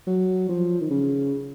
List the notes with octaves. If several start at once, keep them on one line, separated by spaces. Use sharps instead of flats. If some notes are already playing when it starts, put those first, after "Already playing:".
F#3
F3
D#3
C#3